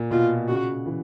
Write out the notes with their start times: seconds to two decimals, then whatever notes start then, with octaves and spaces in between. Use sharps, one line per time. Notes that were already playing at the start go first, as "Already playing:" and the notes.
Already playing: A#2
0.11 B2 F4
0.48 C#3 F#4
0.86 E3